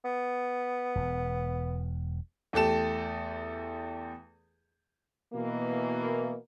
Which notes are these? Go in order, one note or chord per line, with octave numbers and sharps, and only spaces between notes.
B3
E1 E2
E2 A3 G4 A4 E7
B2 E3 A#3